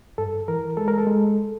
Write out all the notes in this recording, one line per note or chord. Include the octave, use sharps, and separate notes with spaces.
G2 A4
E3 A#4
G#3 A4
A#4
A4
G#3